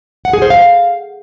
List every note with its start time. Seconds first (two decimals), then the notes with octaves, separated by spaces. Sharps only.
0.25 F#5
0.33 G#4
0.42 C5
0.50 F5